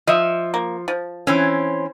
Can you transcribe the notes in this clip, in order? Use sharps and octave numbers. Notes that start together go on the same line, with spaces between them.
F3 D#5 E5
A#3
F3
E3 C4 C#4